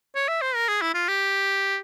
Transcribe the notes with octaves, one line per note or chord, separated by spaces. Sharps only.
C#5
E5
C5
A#4
G#4
E4
F4
G4